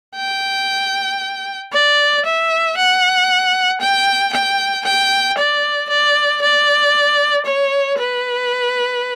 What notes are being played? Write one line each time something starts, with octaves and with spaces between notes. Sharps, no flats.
G5
D5
E5
F#5
G5
G5
G5
D5
D5
D5
C#5
B4